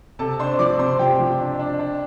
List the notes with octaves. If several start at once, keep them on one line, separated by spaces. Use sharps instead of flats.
C3 A4 A5
D4 C5 C6
F3 D5 D6
C3 C5 C6
F3 G4 G5
F3
D4
D4
D4